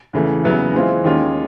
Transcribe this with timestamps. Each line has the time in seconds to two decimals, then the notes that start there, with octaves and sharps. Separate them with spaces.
0.13 E2 C#3 E3 A3
0.44 E2 C#3 F#3 B3 E4
0.73 E3 G#3 C4 F4
1.04 D#2 D#3 G#3 C#4 F4